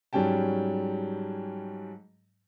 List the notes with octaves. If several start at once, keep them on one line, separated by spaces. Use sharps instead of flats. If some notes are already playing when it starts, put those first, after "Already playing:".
G#2 F#3 G3 C#4 G5 A5